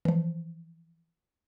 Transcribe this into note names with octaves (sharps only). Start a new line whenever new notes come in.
E3 F3